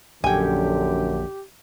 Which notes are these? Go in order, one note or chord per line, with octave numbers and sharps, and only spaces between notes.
A#1 F#2 A#2 D3 G4 G5 G#5